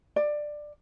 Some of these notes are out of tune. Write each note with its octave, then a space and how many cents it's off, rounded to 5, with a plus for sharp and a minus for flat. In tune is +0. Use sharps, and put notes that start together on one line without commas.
D5 +15